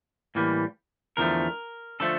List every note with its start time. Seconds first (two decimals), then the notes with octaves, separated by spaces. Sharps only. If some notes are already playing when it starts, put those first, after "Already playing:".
0.35 A2 E3 G3 A#3
1.17 E2 D3 F3 A3 A#4
2.00 D3 F3 A3 A4